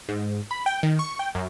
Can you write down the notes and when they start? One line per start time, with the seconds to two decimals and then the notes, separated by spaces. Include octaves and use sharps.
0.09 G#2
0.51 B5
0.66 G5
0.83 D#3
0.99 C#6
1.19 G5
1.35 F#2